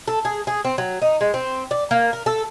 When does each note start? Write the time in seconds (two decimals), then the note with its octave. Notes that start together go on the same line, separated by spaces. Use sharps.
0.08 A4
0.25 G#4
0.47 G#4
0.65 C4
0.78 F#3
1.02 D#4
1.21 G#3
1.34 C4
1.71 D5
1.91 A#3
2.13 A#4
2.26 A4